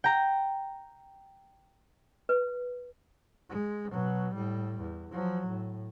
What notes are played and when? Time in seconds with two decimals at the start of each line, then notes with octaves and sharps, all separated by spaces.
0.04 G5 A#5
2.29 B4
3.49 G#3
3.91 B2 F#3
4.35 A2 G3
4.81 E2
5.11 F3 F#3
5.48 A2